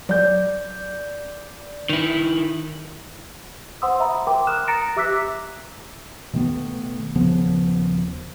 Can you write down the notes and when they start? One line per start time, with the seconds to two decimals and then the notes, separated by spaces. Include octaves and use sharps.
0.09 F#3 D5 G6
1.89 D#3 E4
3.82 C5 F#5 C6 D#6 E6
4.00 E5 A#5 B5
4.27 A#4 G5 C6 D6
4.47 D#6 F6 F#6 E7
4.67 A#5 A6 A#6 C#7 D7 E7
4.96 G4 E5 D6 E6 F#6 B6
6.34 B2 D#3 A3 B3
7.15 D#1 C#3 F3 B3